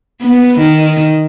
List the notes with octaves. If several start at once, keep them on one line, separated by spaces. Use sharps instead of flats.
B3
D#3